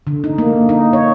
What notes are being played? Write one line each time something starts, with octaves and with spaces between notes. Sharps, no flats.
D3
D#4
A#3
D#4
C#5